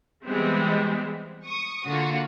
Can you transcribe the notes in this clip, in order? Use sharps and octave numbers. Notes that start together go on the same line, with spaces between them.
E3 G3 G#3 B3 C4
C#6 D#6
D3 A#3 F4 F#4